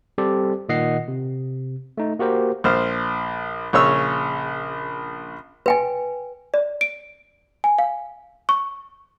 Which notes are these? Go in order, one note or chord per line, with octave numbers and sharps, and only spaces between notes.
G3 C4 G4 A4 C5 D5
A#2 D#3 D#5 F#5 C7
C3
A3 D#4
A#3 F#4 G4 A#4 C5
A#1 C5 F6
A#1 C#3 C#5 E6
B4 G5 G#5
D5
D7
G#5
F5
C#6